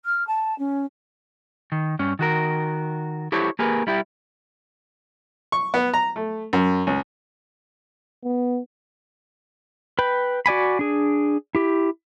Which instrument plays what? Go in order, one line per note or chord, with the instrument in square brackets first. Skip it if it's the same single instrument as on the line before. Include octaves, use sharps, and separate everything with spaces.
[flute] F6
A5
C#4
[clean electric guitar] D#3
G2 C#4
D#3 F#4 A#4
E4 G4 A4 C5 C#5
A#3 G4 G#4 A#4 B4
G3 E4 G4
[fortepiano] C#6
B3
A#5
A3
F#2
C#2
[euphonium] B3
[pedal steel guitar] B4 G5 B5
F#4 D5 G#5 B5
D4 G#4
E4 G4